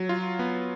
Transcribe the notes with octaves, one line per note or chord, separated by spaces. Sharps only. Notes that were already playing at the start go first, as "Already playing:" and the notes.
Already playing: F#3
F4
B3